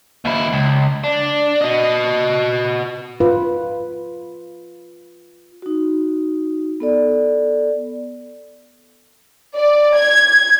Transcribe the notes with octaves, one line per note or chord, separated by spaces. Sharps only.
D#2 E4
C#2
D4
F#4 D#5
F4 B4
D#4 F#4
B3 A4 D5
D5
G#6